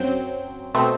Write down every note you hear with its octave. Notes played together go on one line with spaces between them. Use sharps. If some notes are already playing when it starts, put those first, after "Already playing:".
Already playing: F#2 F#3 C4 G5
B2 A3 C4